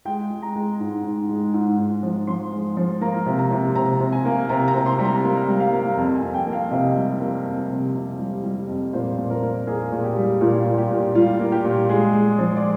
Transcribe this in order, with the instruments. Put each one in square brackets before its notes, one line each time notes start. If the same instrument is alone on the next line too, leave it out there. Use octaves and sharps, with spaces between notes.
[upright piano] G#3 G5
G#3
A#5
G#3
G#2
G#2
G#3
G#2
G#2
F3
F3 C6
G#3
F3
A#3 A#5
C3
A#5
C3
C3 A#5
C3
G#5
A#3
C3 A#5
A#5
C3
C6
G3
A#5
A#3
G3
F5
A#3
F2
G#5
F2
G5
A#3
F5
C3 D#5
G3
A#3
F2
C3
C3
G3
G3
F2
A#2 C5
A#2
A#4
A#3
A#3 G#4
A#2
G4
G3
A#2 F4
A#2
G4
A#2
G3 F4
A#3
G4
A#2
G#3 G#4
G#3
F3
D5